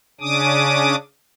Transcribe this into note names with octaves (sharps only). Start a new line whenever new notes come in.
C#3 C#4 D4 D6 D#6